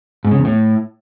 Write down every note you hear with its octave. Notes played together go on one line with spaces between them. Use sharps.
G#2
C#3
E2
A2